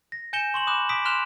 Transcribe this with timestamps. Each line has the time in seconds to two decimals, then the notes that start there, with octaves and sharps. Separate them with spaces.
0.12 A#6
0.33 G#5 G6 A#6 C#7 E7 G7
0.54 C6 C#6 F#7
0.67 B5 D6 D#6 F#6 E7
0.89 D6 D#6 B6 D7
1.05 C6 F6 F#6 E7 F7 G7